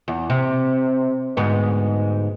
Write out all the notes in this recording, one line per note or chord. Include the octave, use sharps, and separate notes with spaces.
E2
C3
D2 G#2 B3